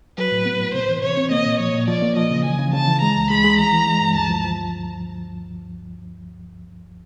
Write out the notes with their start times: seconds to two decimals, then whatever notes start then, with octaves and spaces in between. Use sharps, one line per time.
0.17 F#3 B4
0.32 A2
0.46 B3
0.60 A2
0.74 C3 C5
0.89 E3
1.03 C3 C#5
1.17 C4
1.31 A#3 D#5
1.46 A#2
1.59 F3 C#5
1.74 A#2
1.88 F3 D5
2.02 A#3
2.16 F3 D#5
2.31 C#3
2.45 E3 G#5
2.59 C#3
2.73 C#3 A5
2.88 E3
3.01 G#3 A#5
3.16 C#2
3.30 G#3 B5
3.44 G#3
3.59 E3 A#5
3.73 E3
3.87 G#3
4.01 G2
4.15 D2 A5
4.30 F3
4.44 F3